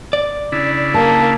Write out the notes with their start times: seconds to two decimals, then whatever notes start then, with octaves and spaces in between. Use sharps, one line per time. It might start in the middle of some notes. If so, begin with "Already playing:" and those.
0.13 D5
0.52 C#3 D4 E4
0.94 A#3 A5